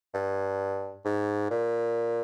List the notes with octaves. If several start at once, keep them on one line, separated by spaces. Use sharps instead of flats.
G2
G#2
A#2